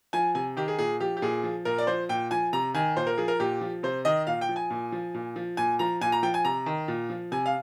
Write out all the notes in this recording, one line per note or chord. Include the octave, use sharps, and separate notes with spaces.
F3 G#5
C3 G#5
D#3 G4
G#4
A#2 G#4
F3 G4
G4
A#2 G#4
F3
A#2 A#4
D5
F3 C5
A#2 G5
F3 G#5
C3 A#5
D#3 G#5
A#2 C5
A#4
F3 G#4
A#4
A#2 G4
F3
C3 C5
D#3 D#5
A#2 F5
G5
F3
G#5
A#2
F3
A#2
F3
A#2 G#5
F3 A#5
A#2 G#5
A#5
F3 G5
G#5
C3 A#5
D#3
A#2
F3
C3 G#5
F5